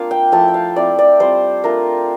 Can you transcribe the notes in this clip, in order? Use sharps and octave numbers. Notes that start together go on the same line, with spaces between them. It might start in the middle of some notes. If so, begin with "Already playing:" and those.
Already playing: A#3 C4 D4 F4 F5 D6
G5
F3 A3 E4 A5
G5
F5
A3 C4 E4 D5
D5
G3 C4 F4 C5
A3 D4 F4 A#4